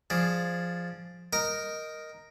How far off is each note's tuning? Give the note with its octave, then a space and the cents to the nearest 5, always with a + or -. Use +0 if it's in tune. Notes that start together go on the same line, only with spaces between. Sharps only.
F3 +0 G#4 +0 D5 +0
A#4 +0 D#5 +0 G5 -10